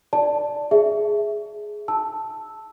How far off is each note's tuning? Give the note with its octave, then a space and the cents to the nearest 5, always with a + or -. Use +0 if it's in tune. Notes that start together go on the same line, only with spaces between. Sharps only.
D5 +0 A5 +5
G#4 +10 E5 -5
A5 +0 E6 -5